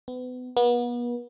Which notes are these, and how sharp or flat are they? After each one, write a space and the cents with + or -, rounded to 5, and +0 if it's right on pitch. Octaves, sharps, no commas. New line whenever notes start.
B3 +30
B3 -35